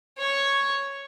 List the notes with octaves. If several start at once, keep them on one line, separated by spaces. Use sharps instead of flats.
C#5 C#6